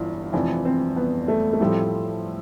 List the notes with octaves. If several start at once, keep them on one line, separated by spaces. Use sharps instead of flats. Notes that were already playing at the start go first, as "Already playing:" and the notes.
Already playing: G1 G2 E3 E4 F4
F1 F2 E3 C4
C4
B3
A3
A3
A2 F3 G3 C4 E4 A4